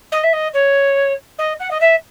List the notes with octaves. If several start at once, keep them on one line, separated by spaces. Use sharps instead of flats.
D#5
E5
D#5
C#5
D#5
F#5
D#5
E5